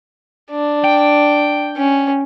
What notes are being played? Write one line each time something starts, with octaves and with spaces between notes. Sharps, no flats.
D4
G5
C#4